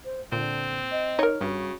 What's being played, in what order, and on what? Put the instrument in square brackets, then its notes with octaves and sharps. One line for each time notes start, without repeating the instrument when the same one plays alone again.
[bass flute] C5
[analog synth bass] A#2 [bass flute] D3 [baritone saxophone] C4
[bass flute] D#5
[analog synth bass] D#4 [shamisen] A#4 C#5
[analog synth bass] G2 [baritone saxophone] C#3 [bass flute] F#4